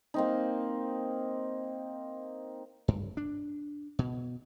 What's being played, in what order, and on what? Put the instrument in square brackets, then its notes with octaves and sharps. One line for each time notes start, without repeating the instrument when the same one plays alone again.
[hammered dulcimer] A#3 C4 D#4
[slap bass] G2
D4
B2